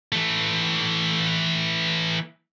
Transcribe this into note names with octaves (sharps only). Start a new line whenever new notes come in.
E3 A3